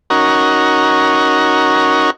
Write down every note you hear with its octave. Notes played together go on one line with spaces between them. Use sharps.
C#4 D#4 F#4 A#4